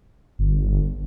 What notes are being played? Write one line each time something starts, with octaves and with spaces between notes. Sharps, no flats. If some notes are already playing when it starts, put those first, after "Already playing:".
G1